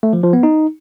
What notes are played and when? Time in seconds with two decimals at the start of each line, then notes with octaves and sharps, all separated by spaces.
0.03 A3
0.13 F3
0.23 F3
0.33 B3
0.43 D#4